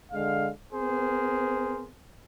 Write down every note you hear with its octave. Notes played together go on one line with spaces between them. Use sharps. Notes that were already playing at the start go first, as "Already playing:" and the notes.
D3 G#3 F5
B3 C4 G#4 A#4 C5